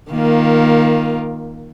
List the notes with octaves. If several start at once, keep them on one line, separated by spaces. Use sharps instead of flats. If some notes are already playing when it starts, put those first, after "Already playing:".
D#3 A#3 F4